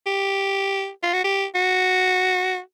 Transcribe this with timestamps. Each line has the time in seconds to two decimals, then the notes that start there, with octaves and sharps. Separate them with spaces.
0.06 G4
1.03 F4
1.13 F#4
1.24 G4
1.55 F#4